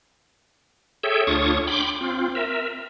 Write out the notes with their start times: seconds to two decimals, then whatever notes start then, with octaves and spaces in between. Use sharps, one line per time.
1.03 G#4 A4 C#5 E5 G5
1.27 D2 D4 F4 C#5 C#6 D#6
1.67 G5 B5 C6 D6
2.01 C4 F4
2.35 A#4 E5